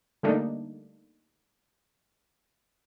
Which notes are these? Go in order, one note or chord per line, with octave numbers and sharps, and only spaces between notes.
D3 G3 A3 A#3 D4 D#4